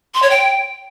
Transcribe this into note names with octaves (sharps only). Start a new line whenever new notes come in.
C6
C#5
G5